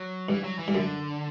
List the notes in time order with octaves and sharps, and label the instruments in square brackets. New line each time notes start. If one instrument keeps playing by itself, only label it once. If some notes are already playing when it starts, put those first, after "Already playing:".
Already playing: [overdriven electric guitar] F#3
[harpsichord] G2 [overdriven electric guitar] E3
[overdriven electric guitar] F#3
E3
[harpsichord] G2
[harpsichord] F#2 [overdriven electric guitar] D3